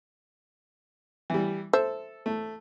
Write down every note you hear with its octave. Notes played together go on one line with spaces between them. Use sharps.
E3 G3
A4 C5 E5
A3